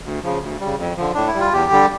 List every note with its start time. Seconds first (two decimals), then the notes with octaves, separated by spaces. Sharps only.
0.05 D2
0.23 C#3 F3
0.42 D2
0.60 C#3 G3
0.79 F2
0.97 D3 F3
1.14 A2 D4
1.27 E4
1.35 G3
1.40 F4
1.53 E2 G4
1.71 D3 G3